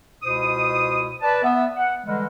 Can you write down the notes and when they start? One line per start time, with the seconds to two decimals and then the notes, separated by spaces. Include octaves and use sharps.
0.23 C#2 B2 E4 C5 D#6
1.21 B4 D5 A5
1.42 B3 E5
1.76 F#5
2.04 D3 E3 G3 G#3